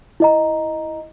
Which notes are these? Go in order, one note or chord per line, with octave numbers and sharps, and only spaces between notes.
E4 D#5 A#5